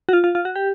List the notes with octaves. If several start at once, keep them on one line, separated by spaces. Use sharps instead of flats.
F#4
F4
F4
F4
F#4
G4